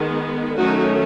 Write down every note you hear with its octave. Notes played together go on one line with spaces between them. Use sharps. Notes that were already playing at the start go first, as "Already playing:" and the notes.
Already playing: D#3 G#3 B3
D#3 F#3 A3 C#4 D#4 F#4